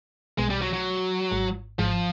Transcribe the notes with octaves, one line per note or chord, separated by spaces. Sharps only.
B1 B2 G#3
G3
F#3
F#3
G#1 G#2
G#1 G#2 F3